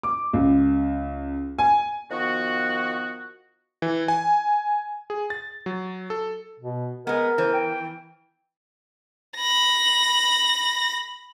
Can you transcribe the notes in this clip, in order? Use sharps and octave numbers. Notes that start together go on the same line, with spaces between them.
D6
C#2
G#5
D#3 F3 B3 F#4
E3
G#5
G#4
A6
F#3
A4
B2
G#3 B3 A#4 D#5
E3 C5
G5
B5 A#6